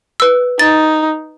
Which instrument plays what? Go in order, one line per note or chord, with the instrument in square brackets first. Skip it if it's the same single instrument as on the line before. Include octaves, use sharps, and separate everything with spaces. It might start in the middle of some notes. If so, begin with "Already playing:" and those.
[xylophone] B4 E6
[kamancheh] D#4 [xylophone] A6